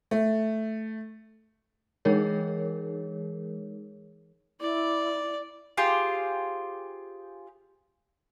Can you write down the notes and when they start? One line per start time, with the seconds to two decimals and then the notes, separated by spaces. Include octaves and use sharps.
0.11 A3
2.05 E3 G#3 D#4 G#4 A#4 C#5
4.61 E4 D5
5.77 F4 G4 G#4 C5